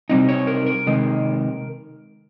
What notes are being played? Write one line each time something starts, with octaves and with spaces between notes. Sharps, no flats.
C3 G3 C4 D#4
C#5
A#4
A#4
C3 D#3 G#3